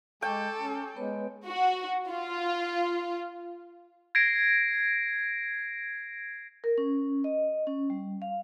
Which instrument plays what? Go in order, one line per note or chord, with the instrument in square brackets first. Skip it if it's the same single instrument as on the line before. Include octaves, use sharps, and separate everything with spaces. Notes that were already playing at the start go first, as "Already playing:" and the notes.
[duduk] G#3 [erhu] A4 [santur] G5 [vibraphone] C#6 D6
[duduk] C#4
[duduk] G#3 [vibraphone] B3 B4 C#5
[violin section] F#4
F4
[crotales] G#6 A#6 C7 D7
[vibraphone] A#4
C#4
D#5
C#4
G3
F5